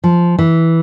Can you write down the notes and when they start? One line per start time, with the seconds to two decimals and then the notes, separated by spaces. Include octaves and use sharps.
0.04 F3
0.39 E3